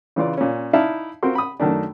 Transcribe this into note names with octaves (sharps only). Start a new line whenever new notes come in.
C#3 E3 F4 D5
A#2 C#4
D#4 E4 D5 E5 F5 A5
C4 F4 F#4 A#4 C6
B5 D#6
F#2 D#3 A3 D4